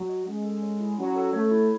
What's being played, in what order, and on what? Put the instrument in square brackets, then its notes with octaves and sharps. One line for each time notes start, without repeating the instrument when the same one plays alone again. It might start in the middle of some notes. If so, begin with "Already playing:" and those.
Already playing: [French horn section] F#3
[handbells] D#5
[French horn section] G#3 [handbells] C#4
[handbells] A4
C#5
E4
[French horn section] F#3 [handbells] C#4
[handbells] A4
[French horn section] A3 [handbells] C#5
[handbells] E4